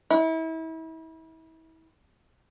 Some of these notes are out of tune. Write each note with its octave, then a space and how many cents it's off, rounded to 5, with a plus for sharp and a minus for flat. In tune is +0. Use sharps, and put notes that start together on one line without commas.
E4 -35